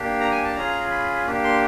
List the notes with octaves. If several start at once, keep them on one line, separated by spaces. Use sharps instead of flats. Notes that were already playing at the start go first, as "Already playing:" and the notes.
Already playing: A#3 D4 G4
A#5
G#5
A5
C#4 F4 G#4 A#5
B5
A#3 D4 G4
C6